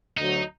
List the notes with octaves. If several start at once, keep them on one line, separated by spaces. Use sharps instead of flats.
D2 D3 F#3 D#4